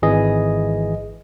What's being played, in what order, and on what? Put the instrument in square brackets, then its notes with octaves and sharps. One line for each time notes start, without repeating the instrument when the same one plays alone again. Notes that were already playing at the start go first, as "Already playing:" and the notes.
[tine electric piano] G#1 E3 G#4 D#5